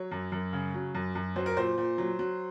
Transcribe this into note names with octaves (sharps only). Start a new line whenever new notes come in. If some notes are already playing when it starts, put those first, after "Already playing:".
Already playing: F#3 C#5
F#2
F#2
C#3
F#3
F#2
F#2
F#3 C5
A#4
A#2 C5
A#2
F#3
F#3